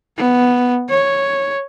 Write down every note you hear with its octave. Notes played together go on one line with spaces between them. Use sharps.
B3
C#5